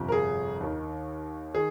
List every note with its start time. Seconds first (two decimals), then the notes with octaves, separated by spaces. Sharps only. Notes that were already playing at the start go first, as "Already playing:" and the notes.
Already playing: G1 F2 C3
0.09 A#4
0.12 G#4
0.61 D#2 D#3
1.54 D#3 G#4